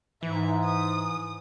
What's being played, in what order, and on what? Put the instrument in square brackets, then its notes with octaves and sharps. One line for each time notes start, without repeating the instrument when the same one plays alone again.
[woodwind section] G#2 [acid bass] E3 [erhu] E5
[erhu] D#6